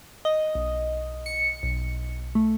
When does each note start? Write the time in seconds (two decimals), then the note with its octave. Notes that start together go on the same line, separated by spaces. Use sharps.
0.25 D#5
0.55 B1
1.26 C#7
1.63 B1
2.35 A3